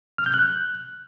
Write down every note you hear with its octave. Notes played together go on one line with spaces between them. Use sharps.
F6
G6
F#6